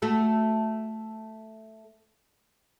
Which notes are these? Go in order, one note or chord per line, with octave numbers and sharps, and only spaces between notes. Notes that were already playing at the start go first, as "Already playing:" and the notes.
A3 F#4 A4